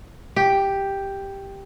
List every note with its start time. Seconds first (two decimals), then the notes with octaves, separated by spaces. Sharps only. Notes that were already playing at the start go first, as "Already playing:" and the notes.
0.36 G4